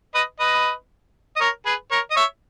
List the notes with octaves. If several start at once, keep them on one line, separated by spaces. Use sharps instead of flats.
B4 D#5
B4 D#5
D#5
A#4 C#5
G#4 B4
A#4 C#5
D#5
C#5 E5